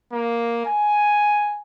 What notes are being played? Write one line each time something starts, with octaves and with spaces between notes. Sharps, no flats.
A#3
G#5